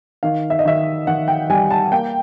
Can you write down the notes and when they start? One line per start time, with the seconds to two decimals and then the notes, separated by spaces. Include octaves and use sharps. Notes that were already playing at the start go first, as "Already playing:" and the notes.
0.23 D#3 F5
0.50 E5
0.59 D#5
0.65 D#3 E5
1.07 D#3 F#5
1.28 G5
1.50 G3 G#5
1.71 A5
1.92 A#3 G5